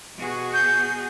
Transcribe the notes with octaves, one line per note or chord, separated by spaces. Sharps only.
B2 F#4 G#4
G6